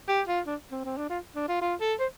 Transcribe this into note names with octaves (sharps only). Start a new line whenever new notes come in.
G4
F4
D4
C4
C4
D4
F4
D4
F4
F4
A4
C5